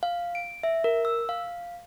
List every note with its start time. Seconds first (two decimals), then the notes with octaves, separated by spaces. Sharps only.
0.03 F5
0.35 D7
0.63 E5
0.84 A#4
1.05 E6
1.29 F5